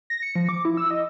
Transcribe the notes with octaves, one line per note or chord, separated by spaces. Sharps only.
A#6
C#7
F3
D6
E4
E6
D#5